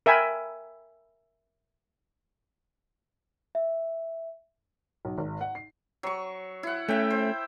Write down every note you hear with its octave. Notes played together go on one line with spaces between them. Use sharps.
A#4 E5 G5 G#5 B5
E5
B1
G#1
F#5
C7
F#3 C#6
E4 F#5
A3 C#4 E5 G5
C5